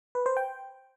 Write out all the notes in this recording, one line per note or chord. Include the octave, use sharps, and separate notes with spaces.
B4
C5
G5